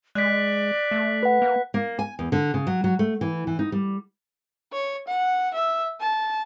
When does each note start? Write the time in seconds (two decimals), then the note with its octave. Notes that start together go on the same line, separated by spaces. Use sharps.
0.15 G#3 D5 F#6 B6
0.91 A3
1.23 B4 F#5
1.42 A#3
1.74 A#3
1.99 G#5
2.19 E2
2.32 D3
2.54 C#3
2.67 F#3
2.84 F#3
2.99 A3
3.21 E3
3.47 E3
3.59 D#4
3.72 G3
4.73 C#5
5.08 F#5
5.54 E5
6.00 A5